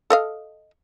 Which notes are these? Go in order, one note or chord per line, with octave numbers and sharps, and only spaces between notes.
A4 D#5 F5